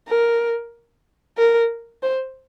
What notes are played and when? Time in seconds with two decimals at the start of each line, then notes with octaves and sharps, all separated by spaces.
0.08 A#4
1.38 A#4
2.03 C5